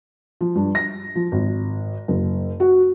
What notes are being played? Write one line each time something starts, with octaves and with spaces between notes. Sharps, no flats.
F3
G2
A#6
F3
G#1
F#1
F#4